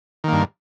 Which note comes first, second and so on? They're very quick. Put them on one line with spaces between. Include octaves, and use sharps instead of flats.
D#3 A#3 G2